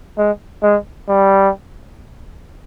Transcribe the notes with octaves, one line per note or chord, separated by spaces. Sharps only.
G#3
G#3
G3